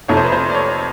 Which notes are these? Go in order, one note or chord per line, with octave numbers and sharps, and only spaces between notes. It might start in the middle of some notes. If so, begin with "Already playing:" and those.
F2 C3 F3 A3 C#5
C5
B4
C5
D5
C#5